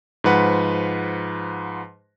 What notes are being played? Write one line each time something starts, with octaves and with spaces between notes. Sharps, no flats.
G#2 F3 B4 F#5